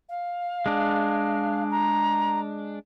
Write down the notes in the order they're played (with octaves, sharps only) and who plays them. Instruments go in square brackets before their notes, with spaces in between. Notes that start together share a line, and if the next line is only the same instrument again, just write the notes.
[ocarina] F5
[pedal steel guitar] G#3 D4
[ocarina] A#5